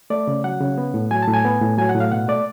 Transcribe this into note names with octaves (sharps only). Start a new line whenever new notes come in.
A3 D5
C#3
F#3 F#5
C#3
B3
A2
F#3 G#5
A5
A2
G#5
B3
A2
F#3 G#5
F#5
A2
F5
B2 F#5
A3 D5